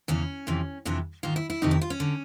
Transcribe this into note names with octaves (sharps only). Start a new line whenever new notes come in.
E2 C#3 E3 C#4
F2 C3 E3
F2 C3 E3 D4
G#2 D#3 F4
E4
E4
F2 C3 D#3 D#4
E4
F4
C#4
D3